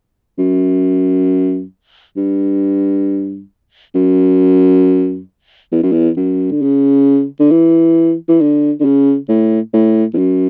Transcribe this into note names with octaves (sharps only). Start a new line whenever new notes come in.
F#2
G2
F#2
E2
F#2
E2
F#2
D3
C#3
D3
E3
E3
D3
D3
C#3
A2
A2
E2
F#2